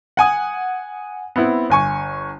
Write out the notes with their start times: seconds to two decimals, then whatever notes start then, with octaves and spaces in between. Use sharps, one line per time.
0.17 F#5 G#5 D#6
1.36 B3 C4 E4
1.70 G1 G#5 C#6